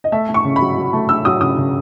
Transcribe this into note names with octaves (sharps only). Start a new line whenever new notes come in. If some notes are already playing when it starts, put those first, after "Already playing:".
D#5
A3 E5
A3
C#6
C#3
F#3 B5
F#3
A3
A3 E6
F#3 D#6
C#3 D#6
C#3